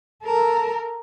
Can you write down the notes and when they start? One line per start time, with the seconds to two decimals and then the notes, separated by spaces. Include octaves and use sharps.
0.23 A4 A#4